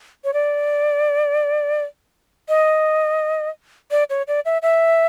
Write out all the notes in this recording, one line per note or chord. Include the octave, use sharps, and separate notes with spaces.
C#5
D5
D#5
D5
C#5
D5
E5
E5